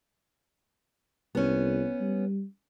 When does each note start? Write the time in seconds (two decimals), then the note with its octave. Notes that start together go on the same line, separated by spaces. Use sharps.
1.35 C2 B3 C#4
2.01 G3